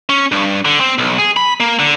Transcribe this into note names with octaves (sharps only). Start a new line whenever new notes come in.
C#4
G2
D3
C4
B1
G#4
B5
A#3
D3